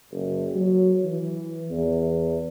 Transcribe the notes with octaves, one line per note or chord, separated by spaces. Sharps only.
F#1
F#3
E3
E2